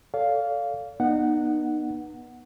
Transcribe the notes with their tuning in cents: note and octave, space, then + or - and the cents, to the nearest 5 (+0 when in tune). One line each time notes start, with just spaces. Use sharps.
A4 +5 D5 -45 F5 +0
B3 -30 D#4 -30 F#5 +0